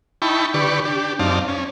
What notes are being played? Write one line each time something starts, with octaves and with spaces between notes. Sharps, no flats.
D#4 E4 G5 A5 B5 C#6
D3 G4 B4 D5 C#6
D4 G4
F#2 C4 D#4 D5 F5 A5
C#4